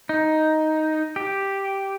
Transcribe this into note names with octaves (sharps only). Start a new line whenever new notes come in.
D#4
G4